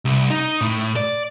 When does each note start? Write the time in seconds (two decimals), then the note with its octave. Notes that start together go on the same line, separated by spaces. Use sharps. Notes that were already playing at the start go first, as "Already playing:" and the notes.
0.05 C2
0.30 D#4
0.61 A2
0.96 D5